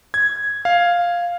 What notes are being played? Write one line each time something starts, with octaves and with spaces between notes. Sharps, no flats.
G#6
F5